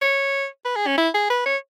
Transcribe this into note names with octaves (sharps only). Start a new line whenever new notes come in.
C#5
B4
G#4
C#4
E4
G#4
B4
C#5